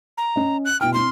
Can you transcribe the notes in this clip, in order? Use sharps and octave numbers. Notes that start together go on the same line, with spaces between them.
A#5
C#4 D#5
F#6
B2 E4 G5 F6
C4 E4 C6